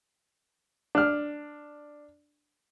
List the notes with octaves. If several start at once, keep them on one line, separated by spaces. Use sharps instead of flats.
D4 F6